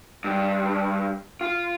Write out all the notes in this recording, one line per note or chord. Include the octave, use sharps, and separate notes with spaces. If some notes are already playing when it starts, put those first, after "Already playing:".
G2
F4